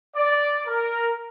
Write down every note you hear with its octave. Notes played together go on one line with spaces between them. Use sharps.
D5
A#4